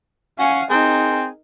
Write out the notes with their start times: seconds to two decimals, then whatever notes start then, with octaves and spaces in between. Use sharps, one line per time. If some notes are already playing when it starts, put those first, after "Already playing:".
0.39 C#4 F5 F#5 G#5
0.70 C4 D#4 G#4 A#4